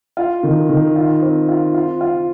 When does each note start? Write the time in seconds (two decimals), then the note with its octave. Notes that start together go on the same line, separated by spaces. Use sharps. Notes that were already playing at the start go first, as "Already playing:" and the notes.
0.17 F4
0.43 D#3
0.69 D#3
0.96 F4
1.22 C4
1.49 F4
1.75 F4
2.01 F4